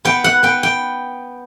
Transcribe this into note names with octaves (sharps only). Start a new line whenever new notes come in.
B3 G5
F#5
B3 G5
G5